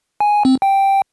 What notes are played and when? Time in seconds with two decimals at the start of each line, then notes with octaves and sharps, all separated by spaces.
0.20 G#5
0.45 C4
0.62 G5